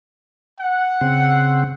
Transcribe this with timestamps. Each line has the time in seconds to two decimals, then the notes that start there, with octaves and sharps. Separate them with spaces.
0.60 F#5
1.01 C#3 C4